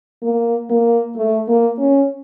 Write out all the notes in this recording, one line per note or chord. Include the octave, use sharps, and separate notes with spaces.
A#3
A#3
A3
A#3
C#4